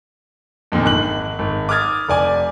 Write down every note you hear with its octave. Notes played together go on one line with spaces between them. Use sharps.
F2 A#2 D3 D#3
G#1 F#6 F#7
G#1
D6 D#6 F6 G#6 A6
F1 D5 G#5 D6